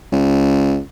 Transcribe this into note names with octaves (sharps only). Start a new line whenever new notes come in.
C#2